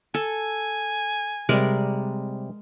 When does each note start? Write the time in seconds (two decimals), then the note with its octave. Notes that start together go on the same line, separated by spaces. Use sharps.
0.14 A4 G#5
1.49 C3 G3 G#3 A#4 D5